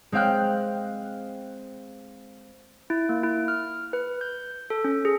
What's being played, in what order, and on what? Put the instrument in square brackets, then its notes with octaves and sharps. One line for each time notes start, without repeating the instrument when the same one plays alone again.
[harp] G#3 C4 F5 G5 F6 F#6
[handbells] E4
A#3
E4
F6
B4
G6
A4
C#4
G#4